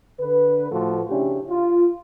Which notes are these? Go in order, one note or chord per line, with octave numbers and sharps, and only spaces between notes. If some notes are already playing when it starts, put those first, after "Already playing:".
D3 B4
A2 F3 A3 F#4 A4
C#3 C#4 D4 E4 G4
F4